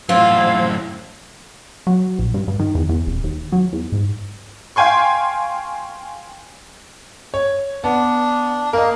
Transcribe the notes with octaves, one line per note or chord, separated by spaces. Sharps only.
F#2 A2 F4 C5 E6 G#6
F#3
A#1
G2
G2
D#3
E2
E2
D#1
D#2
F#3
E2
G#2
F5 G5 G#5 C6 C#6
C#5
B3 D4
A#3 A#4 D#5